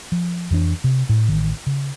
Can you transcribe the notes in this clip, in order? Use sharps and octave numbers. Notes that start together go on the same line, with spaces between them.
F3
F2 E3 D4
C3
A2
A1 D#3
C#3